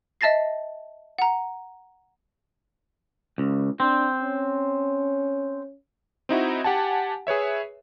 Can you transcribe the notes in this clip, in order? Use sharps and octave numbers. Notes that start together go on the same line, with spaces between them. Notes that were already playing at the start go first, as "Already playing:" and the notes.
D#5 E5 A5 A6 A#6 C7
F#5 A#5
C#2
C4 D4
C#4
C4 D#4 E4 F#4
G4 F#5 G#5 A5
G#4 B4 C#5 E5